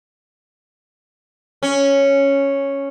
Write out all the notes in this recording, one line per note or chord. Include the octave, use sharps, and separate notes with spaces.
C#4